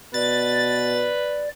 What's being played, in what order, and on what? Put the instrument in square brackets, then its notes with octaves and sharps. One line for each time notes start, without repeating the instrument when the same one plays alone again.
[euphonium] B2 [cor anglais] B4 [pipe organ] D5 [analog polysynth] A6